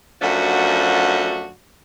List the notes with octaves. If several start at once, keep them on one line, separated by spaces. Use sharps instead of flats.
F#2 F3 A3 D4 F#4